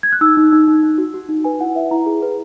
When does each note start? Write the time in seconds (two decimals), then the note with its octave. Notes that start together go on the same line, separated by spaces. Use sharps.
0.03 G#6
0.12 F#6
0.21 D#4 E6
0.37 D#4
0.53 D#4
0.68 D#4
0.83 D#4
0.98 F#4
1.14 F#4
1.29 D#4
1.44 B4 G#5
1.60 E4 F#5
1.75 B4 E5
1.91 E4 A#5
2.06 G#4
2.22 B4